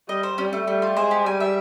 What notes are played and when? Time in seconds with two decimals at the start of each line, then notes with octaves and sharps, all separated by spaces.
0.09 G3 D#5
0.23 C5
0.38 G3 C#4
0.53 A3
0.67 G3 A3
0.82 F4
0.97 G#3 C5
1.11 G4
1.25 G3 G#5
1.40 E5